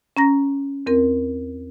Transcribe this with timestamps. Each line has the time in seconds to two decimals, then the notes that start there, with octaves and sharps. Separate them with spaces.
0.17 C#4 A#5 A#6
0.86 E2 C4 A#4